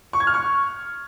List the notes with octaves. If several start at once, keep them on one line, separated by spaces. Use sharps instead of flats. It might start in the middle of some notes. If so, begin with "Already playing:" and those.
C#6
G#6
F6
C#6